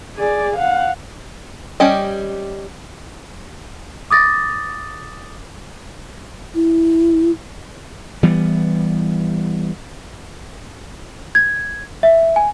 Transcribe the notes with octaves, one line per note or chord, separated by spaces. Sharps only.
G#4 D5
F5 F#5
G3 C#4 G4 D#5
D6 D#6 A6 A#6
E4
E3 G3 B3
G#6
E5
G#5